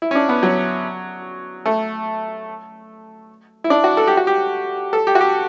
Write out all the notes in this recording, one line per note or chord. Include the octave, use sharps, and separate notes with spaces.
E4
C#4
D4
B3
F#3
A3
E4
D4
F#4
A4
G4
F#4
G4
A4
G4
F#4
G4